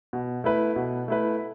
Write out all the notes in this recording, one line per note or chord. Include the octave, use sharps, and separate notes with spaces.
B2
A3 E4 B4
B2
A3 E4 B4